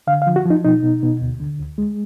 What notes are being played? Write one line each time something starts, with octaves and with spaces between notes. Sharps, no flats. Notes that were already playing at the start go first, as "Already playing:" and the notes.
D3 F5
F5
F3
F#4
F3
D#4
B2 D#4
B2
B2
D2
D3
D2
G#3